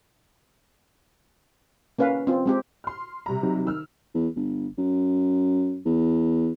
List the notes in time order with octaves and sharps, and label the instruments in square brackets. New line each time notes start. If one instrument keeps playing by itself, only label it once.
[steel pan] A#3 C#4 B4 F5
C4 F4
G#3 C4 G4
[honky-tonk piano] C6 F6
C3 G3 A#5
[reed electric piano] F#3 C4 D#4
[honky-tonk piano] D#3 E6 F6
[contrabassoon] E2
G1
F#2
E2